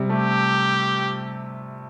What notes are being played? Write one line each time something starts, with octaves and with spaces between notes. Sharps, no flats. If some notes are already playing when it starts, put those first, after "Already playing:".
Already playing: C3 G3
A3 G4